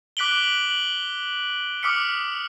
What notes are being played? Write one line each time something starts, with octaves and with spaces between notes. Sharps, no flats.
D6 F#6 B6 D7 F#7 G7
F#7
F#7
D6 D#6 F6 B6 C#7